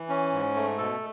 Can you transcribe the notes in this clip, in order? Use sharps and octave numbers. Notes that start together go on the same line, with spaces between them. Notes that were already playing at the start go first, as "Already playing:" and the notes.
Already playing: E3
C#4
G#2
A3
B2 A4